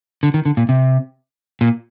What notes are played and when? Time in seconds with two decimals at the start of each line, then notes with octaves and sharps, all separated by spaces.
0.23 D3
0.34 D#3
0.45 D3
0.57 A#2
0.69 C3
1.61 A#2